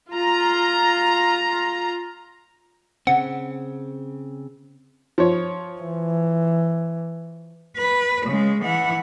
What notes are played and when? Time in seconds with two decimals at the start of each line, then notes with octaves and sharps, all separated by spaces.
0.11 F4 A#5
3.07 C#3 C4 F#5
5.18 F3 C#5
5.81 E3
7.77 B4
8.26 C#3 G#3
8.61 E3 F#5